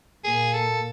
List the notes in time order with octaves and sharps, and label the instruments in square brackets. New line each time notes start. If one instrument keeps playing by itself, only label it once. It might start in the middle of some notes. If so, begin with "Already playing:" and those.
[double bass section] A#2 A#3 [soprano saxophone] G#4
[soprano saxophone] A4